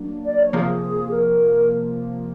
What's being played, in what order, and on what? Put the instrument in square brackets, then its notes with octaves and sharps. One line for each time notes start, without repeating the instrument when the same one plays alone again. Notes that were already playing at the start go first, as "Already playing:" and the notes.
Already playing: [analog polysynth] F#3 A#3 D4
[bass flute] D5
C#5
[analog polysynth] C3 F3 A#3 [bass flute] G#4
[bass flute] A#4